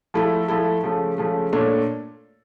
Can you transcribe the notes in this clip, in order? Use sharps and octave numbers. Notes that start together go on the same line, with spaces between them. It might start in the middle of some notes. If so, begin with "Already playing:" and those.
F3 A3 E4 A4
F3 A3 E4 A4
C#3 F3 A3
C#3 F3 A3
A#2 A3 D4 A4 C#5